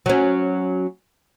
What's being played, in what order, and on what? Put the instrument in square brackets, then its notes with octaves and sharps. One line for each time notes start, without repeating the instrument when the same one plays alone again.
[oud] F#3 C#4